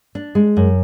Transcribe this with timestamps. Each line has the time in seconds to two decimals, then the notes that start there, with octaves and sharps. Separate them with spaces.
0.15 D4
0.35 G#3
0.57 F#2